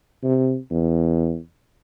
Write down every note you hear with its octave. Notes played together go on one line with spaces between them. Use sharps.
C3
E2